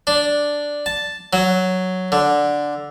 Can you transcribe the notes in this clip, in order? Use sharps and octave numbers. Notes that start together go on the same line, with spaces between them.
D4
A5
F#3
D3